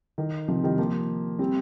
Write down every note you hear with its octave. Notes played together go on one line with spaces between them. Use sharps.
D#3
C3 F3
D#3 G3
F3 A#3
G3 C4